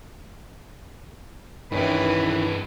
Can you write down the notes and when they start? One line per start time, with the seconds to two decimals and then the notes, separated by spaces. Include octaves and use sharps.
1.72 G2 D#3 E3 C#4 E4 B4